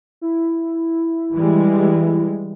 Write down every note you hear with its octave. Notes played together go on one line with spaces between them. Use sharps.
E4
E3 G3 G#3